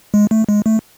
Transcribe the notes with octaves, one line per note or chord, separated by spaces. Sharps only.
G#3
A3
G#3
A3